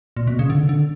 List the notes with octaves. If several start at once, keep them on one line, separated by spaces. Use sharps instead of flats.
A#2
B2
C#3
D3
D3